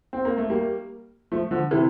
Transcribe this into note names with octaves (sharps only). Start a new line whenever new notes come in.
C4
A#3
A3
G3 A#3
F3 A3
D3 F3
C3 E3